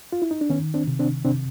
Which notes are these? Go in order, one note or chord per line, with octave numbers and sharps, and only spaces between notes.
F4
E4
D#4
D4
D#3 B3 C#4
C4 D4
C3
C4 D4
C3 C4 D4